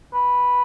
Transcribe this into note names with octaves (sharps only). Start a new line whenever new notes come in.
B4